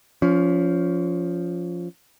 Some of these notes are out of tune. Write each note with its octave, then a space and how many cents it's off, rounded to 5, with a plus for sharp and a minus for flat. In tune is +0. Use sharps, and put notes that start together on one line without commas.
F3 +0 C#4 +25